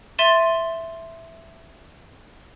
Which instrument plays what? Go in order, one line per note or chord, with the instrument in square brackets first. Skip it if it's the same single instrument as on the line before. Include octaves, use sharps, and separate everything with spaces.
[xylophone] E5 C6 A6 D#7 E7